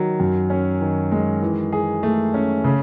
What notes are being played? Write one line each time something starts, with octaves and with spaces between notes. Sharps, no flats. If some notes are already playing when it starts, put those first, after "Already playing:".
Already playing: D#3 F#3
F#2
C#4
D#3
G#3
E3
G#4
A3
C#4
C#3